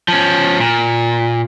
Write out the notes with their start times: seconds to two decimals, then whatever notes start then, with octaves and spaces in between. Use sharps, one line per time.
0.08 F3 C#4
0.60 A#2